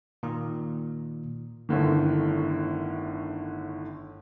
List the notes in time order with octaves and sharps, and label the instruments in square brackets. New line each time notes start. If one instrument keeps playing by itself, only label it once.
[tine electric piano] A#2 D#3
[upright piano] G1 A2 D3 D#3